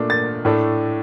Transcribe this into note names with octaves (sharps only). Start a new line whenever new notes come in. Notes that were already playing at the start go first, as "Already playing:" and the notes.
Already playing: A#2 A3 D4
A6
A2 A3 D4